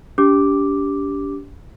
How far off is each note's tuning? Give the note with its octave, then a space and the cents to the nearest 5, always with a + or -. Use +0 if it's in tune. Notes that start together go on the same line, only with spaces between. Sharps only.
D4 -45 G4 +0 D6 +0